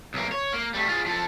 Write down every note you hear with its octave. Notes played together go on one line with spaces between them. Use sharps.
B1 A#3
C#5
A#3
G3 A3
F4 G#4
F3 A4